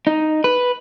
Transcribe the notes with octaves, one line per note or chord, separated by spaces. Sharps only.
D#4
B4